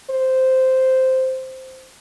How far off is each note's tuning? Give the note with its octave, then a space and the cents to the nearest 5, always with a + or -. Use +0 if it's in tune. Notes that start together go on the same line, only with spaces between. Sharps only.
C5 -5